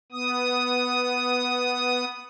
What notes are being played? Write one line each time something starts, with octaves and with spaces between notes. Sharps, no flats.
B3 D#6